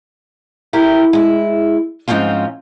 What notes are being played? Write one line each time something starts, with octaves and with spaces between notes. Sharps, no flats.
E4 G4 A#4
G#3 E4
G#2 F3 C4 C#4 F4